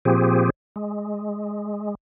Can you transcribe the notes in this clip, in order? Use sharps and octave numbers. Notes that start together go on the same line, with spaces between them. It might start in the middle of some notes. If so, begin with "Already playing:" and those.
A#2 F3 C4 G4 G#4
G#3